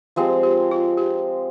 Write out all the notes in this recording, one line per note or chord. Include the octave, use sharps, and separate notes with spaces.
F3 G#3 C4 G4
G4
F4
G4